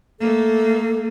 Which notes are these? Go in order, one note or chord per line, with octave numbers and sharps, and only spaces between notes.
A3 A#3 A4